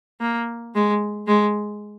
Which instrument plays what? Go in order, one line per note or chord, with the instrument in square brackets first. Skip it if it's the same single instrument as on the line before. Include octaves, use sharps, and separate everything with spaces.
[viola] A#3
G#3
G#3